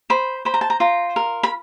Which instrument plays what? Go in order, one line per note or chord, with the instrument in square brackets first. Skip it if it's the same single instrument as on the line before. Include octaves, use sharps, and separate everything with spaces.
[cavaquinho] C5 B5
C5 B5
A#5
A5
A#5
F4 A#5
A#4
B5